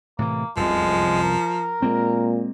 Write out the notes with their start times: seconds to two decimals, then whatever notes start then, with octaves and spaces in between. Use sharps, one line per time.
0.19 A2 C3 E3 A#3
0.57 F1 C2 F#2 F3 G#3
1.23 A#4
1.82 A#2 G#3 A#3 C4